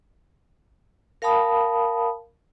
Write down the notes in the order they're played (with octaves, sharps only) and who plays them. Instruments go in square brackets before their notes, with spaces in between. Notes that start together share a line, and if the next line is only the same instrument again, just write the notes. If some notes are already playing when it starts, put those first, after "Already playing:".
[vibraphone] A#4 F5 G5 A5 B5 D#6